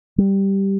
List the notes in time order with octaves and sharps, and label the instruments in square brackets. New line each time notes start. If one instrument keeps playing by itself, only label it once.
[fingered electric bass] G3